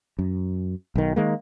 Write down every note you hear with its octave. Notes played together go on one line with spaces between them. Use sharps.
F#2
B1 D#3
D#3 G#3 A#3